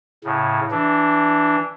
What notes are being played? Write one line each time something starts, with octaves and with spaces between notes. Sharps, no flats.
A2 C#3
E3 D4